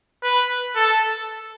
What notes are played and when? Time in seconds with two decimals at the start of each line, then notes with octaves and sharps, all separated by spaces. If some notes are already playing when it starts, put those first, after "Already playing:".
0.23 B4
0.76 A4